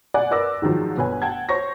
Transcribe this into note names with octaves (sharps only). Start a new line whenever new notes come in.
D5 F#5 G#5 F#6
A#4 B4 D5 D6 E6 A#6
G#2 D#3 F3 F#3
G1 B4 C#5 G#5
F#5 G5 A5 G#6
C5 C#5 C#6 A#6